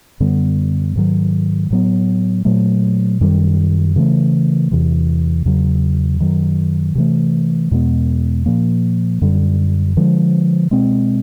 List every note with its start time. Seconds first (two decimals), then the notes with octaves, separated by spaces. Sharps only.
0.20 F#2 D3 G3 B3
0.96 G#2 D#3 F#3
1.70 A2 F#3 B3
2.45 A#2 F#3 A3
3.21 F#2 D#3 G3
3.96 C#3 E3 A3
4.71 E2 C3 E3
5.45 E2 C#3 F#3
6.20 F#2 D#3 F#3
6.95 C3 E3 A3
7.71 E2 B2 G#3 B3
8.46 A#2 F3 A#3
9.21 F#2 D3 G3
9.97 D3 F3 G#3
10.71 B2 G#3 C4